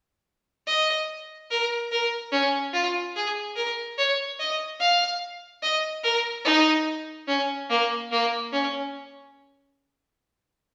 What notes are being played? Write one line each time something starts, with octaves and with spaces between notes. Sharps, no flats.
D#5
A#4
A#4
C#4
F4
G#4
A#4
C#5
D#5
F5
D#5
A#4
D#4
C#4
A#3
A#3
C#4